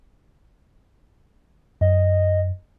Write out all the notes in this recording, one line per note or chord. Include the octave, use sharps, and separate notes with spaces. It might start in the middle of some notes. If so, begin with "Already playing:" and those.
F#2 D#5